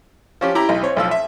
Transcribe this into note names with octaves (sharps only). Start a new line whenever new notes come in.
F3 C#4 G4
E4 G4 A#5
B1 D#5
C4 C#5
B1 F3 E6
E5